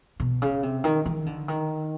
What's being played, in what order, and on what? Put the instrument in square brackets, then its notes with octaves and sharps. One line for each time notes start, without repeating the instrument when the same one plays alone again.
[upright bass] B2
C#3
C3
D#3
D#3
D3
D#3